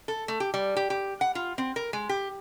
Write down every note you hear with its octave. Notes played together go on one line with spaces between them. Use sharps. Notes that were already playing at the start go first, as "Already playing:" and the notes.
A4
A3
G4
G3
G4
G4
F#5
F4
C4
A#4
G#3
G4